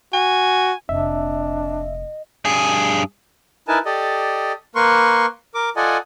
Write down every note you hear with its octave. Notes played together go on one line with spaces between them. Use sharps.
F#4 G#5
F1 A#2 D4 D#5 E5
G2 G#4
D#4 E4 A#4 B4 G#5 A5
G4 A4 D5 D#5
A#3 A#4 B4 C6 C#6
A#4 D6
F4 A4 D5 D#5 F#5 G#5